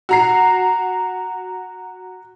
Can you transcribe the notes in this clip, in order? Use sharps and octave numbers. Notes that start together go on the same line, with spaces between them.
F#4 A#5 C7